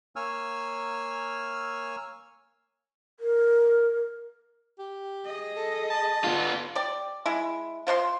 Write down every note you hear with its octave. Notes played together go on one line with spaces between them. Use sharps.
A#3 C#5 G#5 E6 F6
A#4
G4
G#4 D#5
A4
A5
B3 F4
G4 D5
G#3 E4
F4 C5 F#5 C6